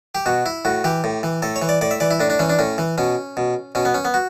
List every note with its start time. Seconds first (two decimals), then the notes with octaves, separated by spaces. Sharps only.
0.15 G4
0.26 B2 F#4
0.46 E4
0.65 A2 F#4
0.84 E3 G4
1.04 A2
1.23 E3
1.42 A2 A4
1.56 C#5
1.62 E3
1.69 D5
1.81 A2 D5
1.91 E5
2.00 E3 D5
2.11 E4
2.20 A2 D4
2.30 D4
2.39 E3 C#4
2.49 D4
2.59 A2 C#4
2.78 E3
2.98 B2 C#4
3.37 B2
3.75 B2 C#4
3.85 B3
3.94 C#4
4.05 B3
4.14 F#4